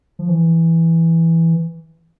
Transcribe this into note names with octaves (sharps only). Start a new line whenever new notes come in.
F3
E3